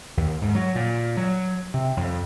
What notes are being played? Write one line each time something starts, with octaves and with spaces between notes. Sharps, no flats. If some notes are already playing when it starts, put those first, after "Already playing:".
D#2
G#2
F#3
A#2
F#3
C3
F2